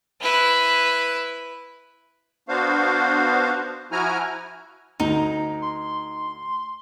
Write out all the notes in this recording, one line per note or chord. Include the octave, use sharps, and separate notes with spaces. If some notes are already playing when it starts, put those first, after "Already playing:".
E4 B4
B3 D4 F#4 C5 F5
F3 E4 F#4 G#5 A#5 F6
D2 D#4 A#5
C6